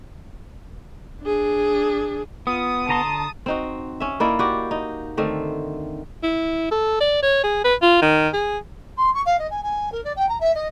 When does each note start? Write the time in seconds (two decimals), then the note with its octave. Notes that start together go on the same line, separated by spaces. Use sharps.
1.22 D4 G#4
2.47 B3 F4 D#6
2.89 D3 A5 A#5 C6
3.46 C4 D#4 F#4
4.00 C#4 E5
4.20 A#3 D#4 E4 D5
4.39 F#4 G4 D5
4.71 D#4
5.17 D3 D#3 A3 C4
6.23 E4
6.71 A4
7.00 D5
7.22 C#5
7.44 G#4
7.64 B4
7.82 F4
8.02 D#3
8.33 G#4
8.98 C6
9.14 C#6
9.26 F5
9.39 D#5
9.51 G#5
9.63 G#5
9.92 A#4
10.04 D5
10.16 G5
10.29 A#5
10.41 E5
10.55 D#5